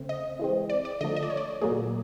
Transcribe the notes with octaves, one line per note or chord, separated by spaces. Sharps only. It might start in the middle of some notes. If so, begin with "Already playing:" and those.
Already playing: C#3 A3 C4
D#5
E3 G#3 C4
D5
D5
D3 F3 A3 D#5
D#5
D5
C#5
D5
A#2 F#3 A3 G#4